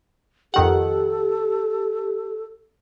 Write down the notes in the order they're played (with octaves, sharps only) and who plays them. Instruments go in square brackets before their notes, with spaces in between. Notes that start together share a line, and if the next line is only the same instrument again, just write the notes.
[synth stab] F2 D#3 F#5 [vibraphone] G4 [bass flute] A4